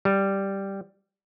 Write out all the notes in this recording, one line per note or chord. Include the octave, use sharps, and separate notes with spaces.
G3